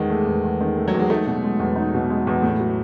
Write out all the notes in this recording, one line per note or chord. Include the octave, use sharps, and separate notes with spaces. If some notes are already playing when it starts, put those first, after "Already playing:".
Already playing: E2 D#3 G#3
A3
E2
E2
D#3
A3
F#3
E2
G#3
A3 D#4
B2
G#3
E2
D#4
B2
G#3
E2
A2
F#3